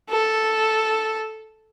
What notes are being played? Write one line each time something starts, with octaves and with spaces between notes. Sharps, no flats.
A4